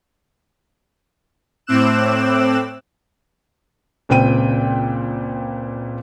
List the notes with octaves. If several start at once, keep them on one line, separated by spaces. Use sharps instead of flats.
A2 C4 D6 E6 F#6 E7
C#2 A#2 C4 G5 D#7